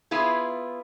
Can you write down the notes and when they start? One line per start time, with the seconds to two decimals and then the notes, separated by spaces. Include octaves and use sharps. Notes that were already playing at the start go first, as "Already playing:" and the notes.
0.11 B3 E4 F4 G#4